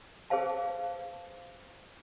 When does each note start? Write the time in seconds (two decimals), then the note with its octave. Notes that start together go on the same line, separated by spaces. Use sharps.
0.30 G#4 B4 C5 F5 A5